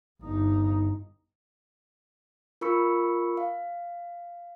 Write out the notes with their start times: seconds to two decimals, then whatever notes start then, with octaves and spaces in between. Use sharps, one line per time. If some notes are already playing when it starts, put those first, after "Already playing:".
0.21 G1 D#4
2.61 F4 A#4 B5 C#6 E6 C#7
3.37 F5